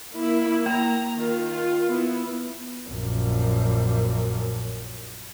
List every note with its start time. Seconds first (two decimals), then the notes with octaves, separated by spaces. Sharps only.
0.19 A#3 E4
0.66 A#3 A#5
1.14 D#3 F4
1.51 F4
1.88 B3 E4
2.89 A#1 F#2